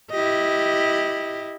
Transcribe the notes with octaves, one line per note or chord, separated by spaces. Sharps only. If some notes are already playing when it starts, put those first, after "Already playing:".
E4 G4 D#5